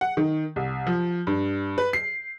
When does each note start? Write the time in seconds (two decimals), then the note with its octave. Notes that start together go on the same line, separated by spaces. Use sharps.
0.01 F#5
0.17 D#3
0.56 C2
0.87 F3
1.27 G2
1.78 B4
1.93 C7